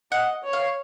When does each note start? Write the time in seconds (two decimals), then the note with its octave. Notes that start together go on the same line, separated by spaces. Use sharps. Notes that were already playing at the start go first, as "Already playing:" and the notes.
0.12 D#5 F#5
0.44 C#5
0.53 F5